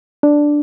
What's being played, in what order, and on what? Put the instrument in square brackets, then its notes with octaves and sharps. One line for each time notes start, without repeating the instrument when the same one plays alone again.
[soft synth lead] D4